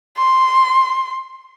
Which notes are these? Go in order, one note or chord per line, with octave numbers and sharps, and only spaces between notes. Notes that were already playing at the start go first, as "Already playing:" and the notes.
C6